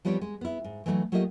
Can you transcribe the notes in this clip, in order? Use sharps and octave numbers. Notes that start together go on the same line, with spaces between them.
F3 G3 B3 C4 C#5
G#3
B3 E4
G#2
E3 F#3 A3 D4 D#4
F#3 A3 A#3 F4 G4 D#5